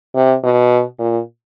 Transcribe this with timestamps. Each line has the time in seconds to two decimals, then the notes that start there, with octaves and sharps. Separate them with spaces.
0.15 C3
0.44 B2
0.99 A#2